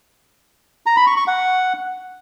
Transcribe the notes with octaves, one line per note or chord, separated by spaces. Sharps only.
A#5
B5
C#6
C#6
F#5